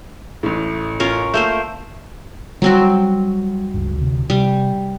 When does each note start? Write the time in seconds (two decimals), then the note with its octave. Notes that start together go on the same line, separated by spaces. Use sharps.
0.43 A1 A2
1.00 C#4 F4 A#4
1.34 A3 A#3 C5 E6 G6
2.62 F#3 G3 C4 F#4
3.74 C#2 G2
3.98 D2 C3
4.30 C3 G3